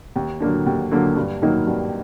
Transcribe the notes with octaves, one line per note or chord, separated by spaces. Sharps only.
D#2
D3 F#3 A#3 D4
D#2
D3 F#3 A#3 D4
G2
D#3 F#3 A#3 D#4
G2